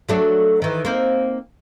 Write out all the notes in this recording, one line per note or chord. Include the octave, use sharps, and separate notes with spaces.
F#3 A3 D4
D#3 E3
A#3 C4 D#4